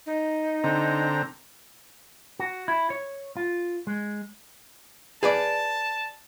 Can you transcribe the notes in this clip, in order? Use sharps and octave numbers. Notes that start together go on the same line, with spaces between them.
D#4
D3 C4 A#5
F#4
E4
C#5
F4
G#3
G#4 B4 D5 A5